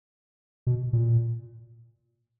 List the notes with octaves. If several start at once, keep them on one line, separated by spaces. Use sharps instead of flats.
B2
A#2